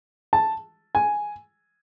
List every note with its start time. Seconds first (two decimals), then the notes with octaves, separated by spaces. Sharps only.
0.33 A5
0.95 G#5